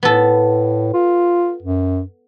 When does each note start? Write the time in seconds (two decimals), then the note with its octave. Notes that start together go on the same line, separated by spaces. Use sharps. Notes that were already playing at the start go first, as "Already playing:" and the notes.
0.03 A2 B3 A4
0.94 F4
1.62 F#2